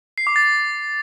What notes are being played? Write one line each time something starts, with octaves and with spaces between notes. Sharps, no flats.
C7
D6
A6